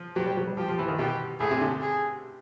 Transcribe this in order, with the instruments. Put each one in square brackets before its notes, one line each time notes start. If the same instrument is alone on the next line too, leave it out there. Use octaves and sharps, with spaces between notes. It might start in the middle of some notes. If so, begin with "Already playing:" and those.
Already playing: [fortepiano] F3
[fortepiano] F#3 [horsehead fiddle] G4
[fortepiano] G3
F#3
G3
[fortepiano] F3 [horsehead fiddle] G4
[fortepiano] F3
E3
D#3
[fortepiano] B2 [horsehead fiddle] G4
[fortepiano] A2 [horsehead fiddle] G#4
[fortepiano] C3
D3
[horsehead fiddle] G#4